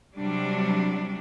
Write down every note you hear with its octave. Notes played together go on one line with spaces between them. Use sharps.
C3 F#3 G3 D4